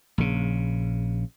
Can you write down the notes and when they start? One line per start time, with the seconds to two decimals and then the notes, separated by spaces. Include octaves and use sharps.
0.18 A#1 C#3